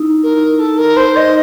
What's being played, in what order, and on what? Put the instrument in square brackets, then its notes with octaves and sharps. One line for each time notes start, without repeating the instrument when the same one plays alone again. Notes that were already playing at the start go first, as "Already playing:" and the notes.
Already playing: [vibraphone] D#4 E4
[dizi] A#4
A4
A#4
C5
D#5
[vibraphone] D#4